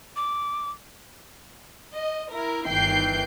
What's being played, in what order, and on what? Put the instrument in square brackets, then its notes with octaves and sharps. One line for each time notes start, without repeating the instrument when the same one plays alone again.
[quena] D6
[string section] D#5
E4 A#4
G1 D#3 E3 G5 G6 C7